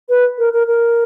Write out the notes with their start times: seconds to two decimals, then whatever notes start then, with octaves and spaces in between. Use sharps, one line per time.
0.09 B4
0.38 A#4
0.53 A#4
0.67 A#4